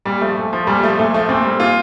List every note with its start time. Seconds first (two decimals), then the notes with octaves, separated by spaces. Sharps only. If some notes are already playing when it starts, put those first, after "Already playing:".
0.05 A#2 G3
0.21 F3 A3
0.37 A#2 A3
0.53 F3
0.67 A#2 G3
0.82 F3 A3
0.99 A#2 A3
1.14 F3 A3
1.29 A#2 C4
1.44 G3
1.60 A#2 F4